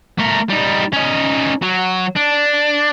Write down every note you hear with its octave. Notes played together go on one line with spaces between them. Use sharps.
A3 A#4
G3 D#4
C#4 D#4
F#3
D4